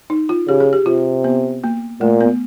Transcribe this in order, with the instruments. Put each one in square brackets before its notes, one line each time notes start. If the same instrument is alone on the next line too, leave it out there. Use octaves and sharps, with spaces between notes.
[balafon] D#4
F4
[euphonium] C#3 [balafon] G4
[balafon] G#4
G4
[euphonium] C3 [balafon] F4
[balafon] B3
A#3
[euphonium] A#2 [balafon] A3
[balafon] B3